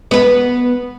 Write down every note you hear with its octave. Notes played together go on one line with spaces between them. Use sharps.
B3 B4